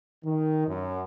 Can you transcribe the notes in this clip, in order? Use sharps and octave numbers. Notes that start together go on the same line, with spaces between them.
D#3
F#2